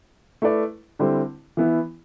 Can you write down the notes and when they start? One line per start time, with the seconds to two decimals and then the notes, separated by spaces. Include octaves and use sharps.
0.42 A3 E4 B4 D5
0.99 D3 G3 C4 E4
1.57 E3 B3 E4